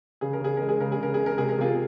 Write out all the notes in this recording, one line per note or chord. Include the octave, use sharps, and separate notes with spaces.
C#3 G#4
A#4
C#3 G#4
G#3 A#4
G#4
C#3 A#4
G#4
C#3 A#4
G#4
G#3
A#4
C3 G#4
A#4
C3 F4 G#4